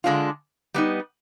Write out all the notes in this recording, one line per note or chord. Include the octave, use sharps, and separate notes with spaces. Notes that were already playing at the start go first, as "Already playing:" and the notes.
D3 G#3 D4 F4
G3 B3 D#4